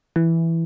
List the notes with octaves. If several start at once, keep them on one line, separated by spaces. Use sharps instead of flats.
E3